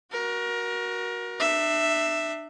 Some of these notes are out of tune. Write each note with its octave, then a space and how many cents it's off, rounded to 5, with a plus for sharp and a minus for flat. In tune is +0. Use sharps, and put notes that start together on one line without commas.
F#4 +0 A#4 +25
D4 +40 E5 +0